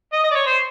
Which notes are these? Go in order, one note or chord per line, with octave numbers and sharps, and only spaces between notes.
D#5
D#5
D5
C#5
C5